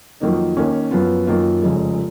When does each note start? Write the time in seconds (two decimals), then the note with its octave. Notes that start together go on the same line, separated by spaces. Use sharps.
0.20 F2 D#3 F#3 A#3 D#4
0.57 D#2 D#3 A#3 C#4
0.91 F#2 F3 B3 F4
1.27 F#2 D#3 A#3 F4
1.62 F1 F2 C#3 G#3